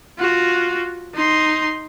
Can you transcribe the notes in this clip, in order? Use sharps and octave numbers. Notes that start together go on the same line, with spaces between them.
F4 F#4
D#4 C6